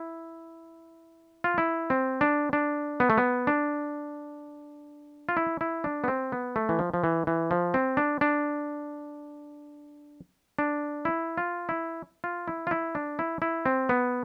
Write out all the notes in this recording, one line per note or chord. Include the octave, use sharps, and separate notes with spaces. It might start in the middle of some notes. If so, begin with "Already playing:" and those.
Already playing: E4
F4
E4
C4
D4
D4
B3
A3
B3
D4
F4
E4
E4
D4
B3
C4
B3
A3
E3
F3
F3
E3
E3
F3
C4
D4
D4
D4
E4
F4
E4
F4
E4
F4
E4
D4
E4
E4
C4
B3